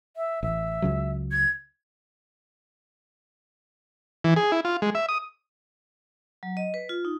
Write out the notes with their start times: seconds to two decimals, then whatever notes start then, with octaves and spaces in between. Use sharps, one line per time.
0.17 E5
0.43 A1 E5
0.82 C#2 C#3 F#3
1.32 G#6
4.24 E3
4.36 G#4
4.52 E4
4.65 F4
4.82 G#3
4.95 E5
5.09 D#6
6.43 F#3
6.57 D#5
6.74 B4
6.89 F4
7.05 D#4